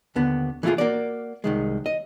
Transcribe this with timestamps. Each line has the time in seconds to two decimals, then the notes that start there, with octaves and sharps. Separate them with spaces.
0.16 D#2 D3 B3
0.63 E3 A3 A#3 E4 F4 G#4
0.78 A#3 F#4 D5
1.44 C2 D#3 G#3
1.86 D#5